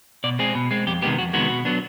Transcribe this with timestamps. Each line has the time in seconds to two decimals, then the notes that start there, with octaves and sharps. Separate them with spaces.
0.24 B2 D5
0.39 G#3 C4 G#4
0.55 B2
0.71 G#3 C4
0.87 F2 G4
1.02 C3 D#3 G#3 B3 G4
1.18 F2 F#4
1.33 C3 D#3 G#3 B3 F#4
1.50 B2
1.65 F#3 B3 D4